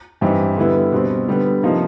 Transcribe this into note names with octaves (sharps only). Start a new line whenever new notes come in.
G2 E3 G3 C4 D#4
D3 G3 B3 E4
B2 G3 C4
D3 G3 B3
C3 F3 A#3 D#4